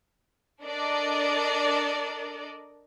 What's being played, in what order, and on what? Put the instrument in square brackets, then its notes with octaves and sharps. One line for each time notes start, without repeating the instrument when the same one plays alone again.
[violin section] D4 A4 A#4 D5 D#5